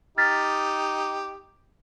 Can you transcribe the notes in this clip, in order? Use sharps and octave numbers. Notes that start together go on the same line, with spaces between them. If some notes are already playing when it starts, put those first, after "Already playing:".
D#4 G4 F6 A6 B6